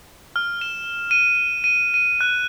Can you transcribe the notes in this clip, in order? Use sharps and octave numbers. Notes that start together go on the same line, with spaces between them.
F6
E7
D#7
D#7
D#7
F#6